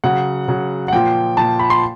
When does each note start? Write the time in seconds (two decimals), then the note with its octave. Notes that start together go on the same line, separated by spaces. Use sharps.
0.04 C#3 F#3 F#5
0.48 C#3 F#3
0.88 F#5
0.93 A#2 F3 G5
1.37 A#2 F3 A5
1.59 B5
1.70 C6